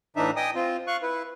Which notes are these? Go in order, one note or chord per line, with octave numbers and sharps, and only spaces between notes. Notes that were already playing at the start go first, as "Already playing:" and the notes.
A2 E3 D4 D#4 E5
D#5 G5 G#5 D#6
C4 F4
F5 C#6 F#6
E4 B4